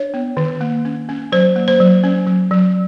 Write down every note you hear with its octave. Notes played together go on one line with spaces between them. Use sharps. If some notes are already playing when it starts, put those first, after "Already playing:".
Already playing: D4 C#5
B3
D#3
A#3
C#4
C#4
F#3 C5
A#3
C5
F#3
C#4
F#3
F#3